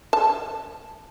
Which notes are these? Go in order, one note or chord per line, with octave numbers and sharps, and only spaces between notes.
A5